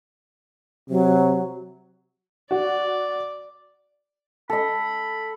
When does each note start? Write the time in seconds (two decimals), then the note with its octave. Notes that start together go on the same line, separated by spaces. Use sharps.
0.89 C3 F#3
2.51 F#4 D5
4.50 A4 D#5 B5